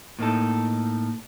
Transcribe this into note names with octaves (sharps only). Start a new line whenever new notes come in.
A2 A#3 D#4 A4